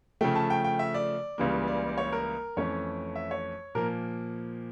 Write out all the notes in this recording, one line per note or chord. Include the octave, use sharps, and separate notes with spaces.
C#3 F3 A3 G5
A5
G5
G5
E5
D5
C#2 C#3 E3 G3 A#3
D5
D5
C#5
A#4
F2 E3 A3 C#4 C#5
E5
C#5
A#2 F3 A#3 A#4